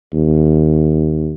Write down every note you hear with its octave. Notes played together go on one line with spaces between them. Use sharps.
D#2